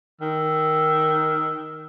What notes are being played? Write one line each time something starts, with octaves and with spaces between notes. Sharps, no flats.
D#3 E6